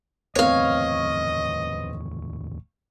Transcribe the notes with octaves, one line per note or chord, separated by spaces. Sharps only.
D1 E2 A3 B3 C4 C#5 D#5 F5